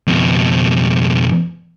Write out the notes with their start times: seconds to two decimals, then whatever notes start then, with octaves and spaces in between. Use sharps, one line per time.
0.07 F2 B2